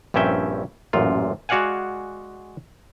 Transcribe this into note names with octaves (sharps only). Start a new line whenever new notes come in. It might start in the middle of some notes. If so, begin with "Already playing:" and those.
A#1 G2 C4 C#4 E5 G5
A1 F#2 A#2 F4
G#3 F#4 D5 F5 F#5 G#5